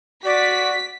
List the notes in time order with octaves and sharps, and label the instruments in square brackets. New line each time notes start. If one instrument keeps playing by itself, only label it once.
[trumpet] F#4 [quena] D5 [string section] B6